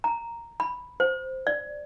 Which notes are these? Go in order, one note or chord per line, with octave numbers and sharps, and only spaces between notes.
A#5
B5
C5
D5